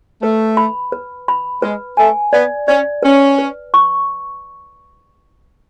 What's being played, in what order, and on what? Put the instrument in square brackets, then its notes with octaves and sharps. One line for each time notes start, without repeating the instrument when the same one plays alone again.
[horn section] A3 [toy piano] B4
[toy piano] B5
B4
B5
[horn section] G#3 [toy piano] B4
[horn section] A3 [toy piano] G#5
[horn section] B3 [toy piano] D5
[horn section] C#4 [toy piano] D5
[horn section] C#4 [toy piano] B4
[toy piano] B4
C#6